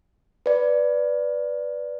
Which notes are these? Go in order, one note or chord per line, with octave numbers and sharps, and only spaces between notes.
B4 D5